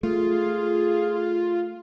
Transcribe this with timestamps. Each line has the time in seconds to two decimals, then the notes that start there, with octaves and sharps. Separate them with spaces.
0.03 A3 F4 G#4